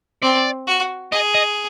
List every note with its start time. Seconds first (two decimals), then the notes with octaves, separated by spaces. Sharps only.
0.22 C4 D5
0.67 F#4
1.12 G#4 D#5
1.35 D#5